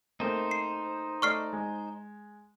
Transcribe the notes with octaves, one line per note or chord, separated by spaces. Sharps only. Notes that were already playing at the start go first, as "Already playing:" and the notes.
A3 A#3 C4 D#4 C5
C7
A3 D5 D#5 C#6 F6 C7
G#3